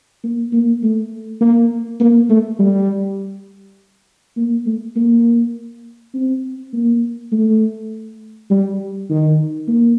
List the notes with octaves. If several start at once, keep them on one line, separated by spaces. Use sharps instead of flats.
A#3
A#3
A3
A#3
A#3
A3
G3
A#3
A3
A#3
C4
A#3
A3
G3
D#3
A#3